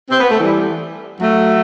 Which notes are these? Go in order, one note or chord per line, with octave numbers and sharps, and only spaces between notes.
C4
B3
A3
E3 G3
F#3 A3